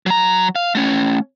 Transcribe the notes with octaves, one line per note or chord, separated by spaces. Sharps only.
F#3 A#5
F5
A3 C#4